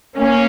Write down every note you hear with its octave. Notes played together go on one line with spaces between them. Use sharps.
A#3 C#4